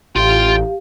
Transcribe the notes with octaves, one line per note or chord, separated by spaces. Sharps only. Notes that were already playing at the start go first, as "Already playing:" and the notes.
A1 F4 G4 F5 G5 C6